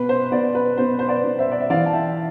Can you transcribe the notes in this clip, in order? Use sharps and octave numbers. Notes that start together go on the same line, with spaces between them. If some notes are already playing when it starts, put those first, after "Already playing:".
Already playing: B2 B4
C5
B2 B4 D5
C5
B4
B2 C5
C5
B4 D5
B2
C5 E5
D5
E5
E3 D5 F5
A5
E5 G5